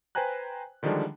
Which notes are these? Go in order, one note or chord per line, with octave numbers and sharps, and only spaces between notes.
B4 C5 G5 G#5 A#5 F#6
D3 D#3 F3 G3 G#3 D4